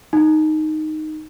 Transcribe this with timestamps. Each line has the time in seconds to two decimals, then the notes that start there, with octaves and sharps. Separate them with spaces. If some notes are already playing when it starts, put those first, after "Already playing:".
0.13 D#4